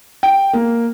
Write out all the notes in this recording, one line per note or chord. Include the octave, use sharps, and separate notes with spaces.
G5
A#3